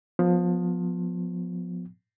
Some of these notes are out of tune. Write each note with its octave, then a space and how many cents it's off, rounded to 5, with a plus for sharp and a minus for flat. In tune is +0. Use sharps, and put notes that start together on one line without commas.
F3 +25 B3 +0